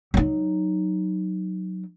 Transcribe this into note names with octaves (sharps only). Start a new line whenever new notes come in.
F#3 D#4